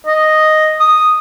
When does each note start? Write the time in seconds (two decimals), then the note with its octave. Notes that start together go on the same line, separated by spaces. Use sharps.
0.06 D#5
0.80 D#6